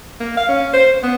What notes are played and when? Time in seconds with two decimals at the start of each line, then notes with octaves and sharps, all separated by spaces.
0.20 A#3
0.37 F5
0.49 C#4
0.73 C5
1.03 B3